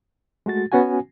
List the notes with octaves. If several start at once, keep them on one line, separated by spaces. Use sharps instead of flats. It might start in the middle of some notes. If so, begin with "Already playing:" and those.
G#3 A3 F#4 A6
B3 C#4 F#4 F#5 G#5